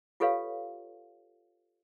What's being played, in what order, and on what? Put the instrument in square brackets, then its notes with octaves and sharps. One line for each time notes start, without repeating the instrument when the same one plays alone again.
[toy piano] F4 G4 A4 B4 C#5 F5